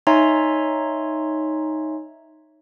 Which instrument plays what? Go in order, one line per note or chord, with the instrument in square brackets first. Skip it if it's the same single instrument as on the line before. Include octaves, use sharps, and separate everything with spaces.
[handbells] D#4 C#5 E5 G#5 A#5 C6